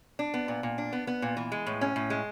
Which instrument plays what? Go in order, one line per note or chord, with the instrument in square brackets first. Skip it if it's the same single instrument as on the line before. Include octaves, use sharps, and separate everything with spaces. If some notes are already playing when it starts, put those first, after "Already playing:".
[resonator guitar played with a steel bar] D4
B3
A#2
A#2
D4
B3
B3
A#2
E3
G#3
A2
C#4
A2
G#3